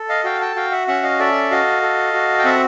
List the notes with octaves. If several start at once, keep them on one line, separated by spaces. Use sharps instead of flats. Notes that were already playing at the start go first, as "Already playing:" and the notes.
Already playing: A4
D#5 F5
F#4 F5 G5
G5 A5
F#4 F5 G5
E5 F#5
C#4 E5 F#5
D#5 F5
A4 D5 E5
F#4 D#5 F5
A4
F#4
G5
C4 E5 F#5